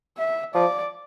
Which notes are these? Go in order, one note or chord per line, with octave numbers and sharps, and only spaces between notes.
E5
F3 D5